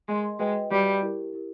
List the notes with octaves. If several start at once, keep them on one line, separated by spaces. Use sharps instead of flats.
G#3 A#4 D#5 G#5 C6
G#3 F#4 B4 D#5 G5
G3 F#4 B4 D#5 G5
E4 G4 A#4
E4 G4 A#4